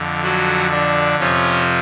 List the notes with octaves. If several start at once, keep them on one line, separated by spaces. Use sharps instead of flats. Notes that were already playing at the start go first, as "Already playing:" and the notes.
Already playing: F2 D3
F#3 F#4
D4
F2 C3 F3 C#4